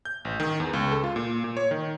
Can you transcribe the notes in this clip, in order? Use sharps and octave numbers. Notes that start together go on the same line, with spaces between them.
G6
A1
D#3
E2
C#2
A4
F4
A#2
A#2
C#5
D#3